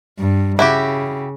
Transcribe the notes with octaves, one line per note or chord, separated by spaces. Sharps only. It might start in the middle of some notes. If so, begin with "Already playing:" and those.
G2
C#3 E4 F#4 G4